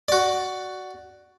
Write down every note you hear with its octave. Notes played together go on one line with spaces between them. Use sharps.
F#4 D5